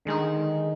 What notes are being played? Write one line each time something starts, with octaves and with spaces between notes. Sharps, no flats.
D3 D#3 G#3 D#4